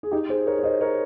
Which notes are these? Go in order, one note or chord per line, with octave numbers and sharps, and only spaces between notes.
G#4
D#4 G4
G#4 C5
A#4 C#5
C#5
C5 D#5
A#4 C#5